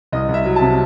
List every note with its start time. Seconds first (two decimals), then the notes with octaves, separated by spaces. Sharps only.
0.13 C2 D#5
0.29 C2
0.34 E5
0.45 F#3
0.56 A5
0.61 C3